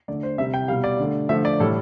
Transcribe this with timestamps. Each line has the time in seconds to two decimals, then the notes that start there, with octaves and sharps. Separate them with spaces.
0.08 D3 A3 D5
0.23 C5
0.38 C3 G3 E5
0.54 G5
0.68 B2 G3 F5
0.84 D5
0.99 D3 A3
1.29 D3 F3 A3 E5
1.45 D5
1.60 A2 E3 G3 A4